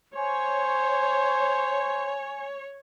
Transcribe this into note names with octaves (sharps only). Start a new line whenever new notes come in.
C5 C#5 G#5